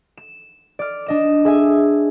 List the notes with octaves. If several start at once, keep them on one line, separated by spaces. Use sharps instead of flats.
E7
D5 F6
D4 D#5 E7
G#4 E5 G#5